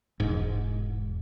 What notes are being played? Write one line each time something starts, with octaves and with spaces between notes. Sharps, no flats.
E1 G#2